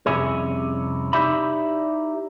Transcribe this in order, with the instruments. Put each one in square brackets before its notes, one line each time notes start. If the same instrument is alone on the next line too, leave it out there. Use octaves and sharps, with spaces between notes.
[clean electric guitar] C2 F2 C3 C#4 E4 G#4
D#4 E4 G4 D5 E5 B5